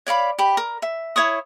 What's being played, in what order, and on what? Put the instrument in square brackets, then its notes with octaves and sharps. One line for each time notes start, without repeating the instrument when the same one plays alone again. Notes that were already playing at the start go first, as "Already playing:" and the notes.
[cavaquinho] C#5 D5 F5 B5
G4 B5
A#4
E5
E4 C#5 C#6 D#6